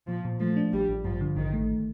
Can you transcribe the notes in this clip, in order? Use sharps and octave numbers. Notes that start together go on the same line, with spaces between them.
A#2 F3
A#2
F3 A3
D4
A1 G3
A1
G2 F3
D3
A1 D#3
A3